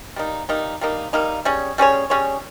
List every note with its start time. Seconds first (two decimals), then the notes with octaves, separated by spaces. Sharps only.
0.16 G3 A#3 D#4
0.49 G3 A#3 D#4
0.81 G3 A#3 D#4
1.13 G3 A#3 D#4
1.45 G3 C#4 G#4 C#5
1.78 G3 C#4 G#4 C#5
2.10 G3 C#4 G#4 C#5